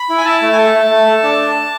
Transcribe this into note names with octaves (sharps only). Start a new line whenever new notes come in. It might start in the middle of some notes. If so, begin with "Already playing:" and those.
Already playing: B5
E4
G#5
E4 A5
A3
G#5
A4 A5
A3
A3
A4
D4